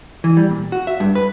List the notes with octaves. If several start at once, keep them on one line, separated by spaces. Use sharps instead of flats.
E3
G3
A#2
F#4
E5
G2
B4